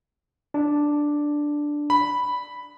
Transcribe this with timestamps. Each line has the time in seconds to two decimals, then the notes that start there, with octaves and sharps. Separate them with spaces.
0.54 D4
1.90 B5